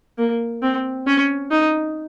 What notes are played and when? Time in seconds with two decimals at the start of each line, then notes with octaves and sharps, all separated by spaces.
0.18 A#3
0.62 C4
1.07 C#4
1.51 D#4